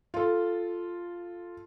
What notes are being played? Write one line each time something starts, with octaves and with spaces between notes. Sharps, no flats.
F4 A4